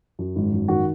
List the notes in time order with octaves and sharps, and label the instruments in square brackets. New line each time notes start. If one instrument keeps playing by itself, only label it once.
[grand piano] F#2
G#1
F#2
D#3 F#4